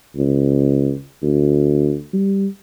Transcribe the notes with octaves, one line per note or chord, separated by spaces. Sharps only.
C#2
D2
G3